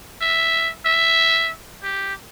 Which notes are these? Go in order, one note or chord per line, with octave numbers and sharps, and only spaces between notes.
E5
E5
G4